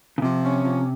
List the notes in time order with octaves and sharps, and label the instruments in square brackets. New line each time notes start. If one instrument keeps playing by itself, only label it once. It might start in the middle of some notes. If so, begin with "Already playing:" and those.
[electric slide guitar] C#3
[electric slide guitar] C3 [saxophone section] F3
[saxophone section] C#4
F3